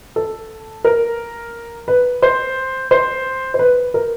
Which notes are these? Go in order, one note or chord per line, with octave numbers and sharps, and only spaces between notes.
A4
A#4
B4
C5
C5
C5
B4
A#4